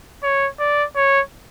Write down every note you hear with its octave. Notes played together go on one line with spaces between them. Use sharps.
C#5
D5
C#5